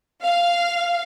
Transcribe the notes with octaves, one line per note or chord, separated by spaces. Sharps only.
F5